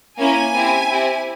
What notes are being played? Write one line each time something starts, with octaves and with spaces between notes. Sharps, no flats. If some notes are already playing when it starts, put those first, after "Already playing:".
A#3 C#4 E4 G#5
C4 E4 G4
C4 E4 G4